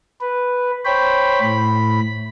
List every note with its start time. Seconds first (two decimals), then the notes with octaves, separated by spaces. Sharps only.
0.21 B4
0.85 C5 C#5 G5 B5
1.42 A2 B5